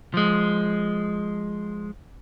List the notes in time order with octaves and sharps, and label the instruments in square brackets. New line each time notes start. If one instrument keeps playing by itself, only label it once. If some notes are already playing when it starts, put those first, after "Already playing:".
[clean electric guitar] F3 G#3